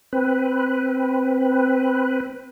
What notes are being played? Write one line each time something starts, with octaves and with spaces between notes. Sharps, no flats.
C4 B4